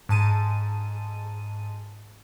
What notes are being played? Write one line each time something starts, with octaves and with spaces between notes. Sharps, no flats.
G#2 A5 D#7